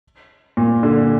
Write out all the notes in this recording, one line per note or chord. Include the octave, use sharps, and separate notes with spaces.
A#2
D3